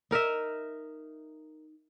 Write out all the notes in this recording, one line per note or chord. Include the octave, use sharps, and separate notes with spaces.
D#4 A#4 D#5 E5